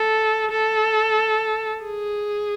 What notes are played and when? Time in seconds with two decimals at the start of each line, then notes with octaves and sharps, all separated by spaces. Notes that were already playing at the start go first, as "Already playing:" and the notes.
Already playing: A4
0.51 A4
1.83 G#4